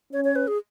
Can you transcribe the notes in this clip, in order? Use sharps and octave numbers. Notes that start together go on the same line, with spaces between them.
C#4 C#5
C#5
B4
G#4